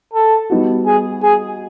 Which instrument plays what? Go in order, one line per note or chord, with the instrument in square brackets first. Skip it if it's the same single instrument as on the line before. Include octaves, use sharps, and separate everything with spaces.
[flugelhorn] A4
[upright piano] G3 B3 D#4 F#4
[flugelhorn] G#4
G#4